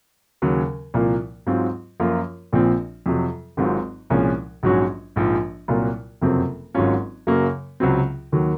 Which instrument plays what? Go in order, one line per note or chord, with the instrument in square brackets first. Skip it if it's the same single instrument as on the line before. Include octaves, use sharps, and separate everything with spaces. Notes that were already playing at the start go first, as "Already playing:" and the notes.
[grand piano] D#2 C#3 F#3 C#4
C2 A#2 F3 A#3
G#2 F#3 C4 F4
F#2 F3 A#3 F4
A#1 A#2 F3 C4
F2 C3 F#3
G#1 G#2 F#3 C4 F4
C2 A#2 F3 G#3 C#4
A#1 G#2 F#3 C#4 F#4
A#1 G#2 F3
C2 A#2 F#3 A#3 F4
F#1 F2 C3 F#3 C4
G#1 G#2 F#3 C#4 F4
F#2 C#3 F#3 A#3
C#2 C3 F#3 C4
D#2 D#3 F#3